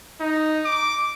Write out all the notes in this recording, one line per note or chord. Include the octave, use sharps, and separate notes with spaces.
D#4
D6